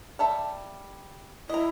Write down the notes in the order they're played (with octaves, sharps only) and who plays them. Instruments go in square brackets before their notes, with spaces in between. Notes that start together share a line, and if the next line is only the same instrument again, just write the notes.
[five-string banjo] G3 A4 E5
[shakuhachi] E4 [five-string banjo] D#5 A#5